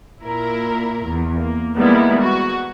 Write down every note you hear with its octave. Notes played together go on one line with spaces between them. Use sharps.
A#2 E4 A#4
E2
A#3
D#3 G3 G#3 A#3 B3 E4
F#4